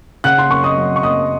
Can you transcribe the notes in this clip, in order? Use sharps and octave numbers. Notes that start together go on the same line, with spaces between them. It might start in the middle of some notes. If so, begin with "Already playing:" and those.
C#3 F#5 F#6
C6
F#2 C#6
D#5 D#6
F#3
C#6
F#2 D#5 D#6